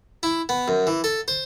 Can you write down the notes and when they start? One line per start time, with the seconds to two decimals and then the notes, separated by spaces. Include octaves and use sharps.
0.23 E4
0.49 B3
0.68 F#2
0.87 E3
1.04 A4
1.28 C5